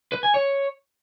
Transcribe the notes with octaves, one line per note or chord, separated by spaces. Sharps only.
B4
G#5
C#5